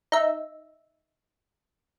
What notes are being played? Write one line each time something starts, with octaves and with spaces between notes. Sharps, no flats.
D#4 E5